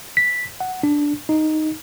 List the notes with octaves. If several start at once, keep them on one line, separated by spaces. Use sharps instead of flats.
B6
F#5
D4
D#4